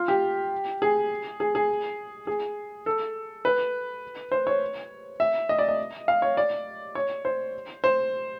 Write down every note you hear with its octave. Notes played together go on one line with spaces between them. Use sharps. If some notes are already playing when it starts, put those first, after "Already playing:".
Already playing: F4
G4
G#4
G#4
G#4
G#4
A4
B4
C5
C#5
E5
D#5
D5
D#5
F5
C#5
D5
C#5
C5
C5